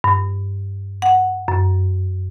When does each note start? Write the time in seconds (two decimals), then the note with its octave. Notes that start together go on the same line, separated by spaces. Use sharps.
0.04 G2
1.02 F#5
1.48 F#2